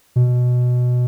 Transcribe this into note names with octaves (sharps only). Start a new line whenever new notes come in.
B2